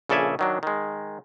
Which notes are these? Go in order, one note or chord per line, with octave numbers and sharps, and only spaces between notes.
A#1 C#3 A4 D5 E5 G#5
D#3 F#3 D4
D#3 G#3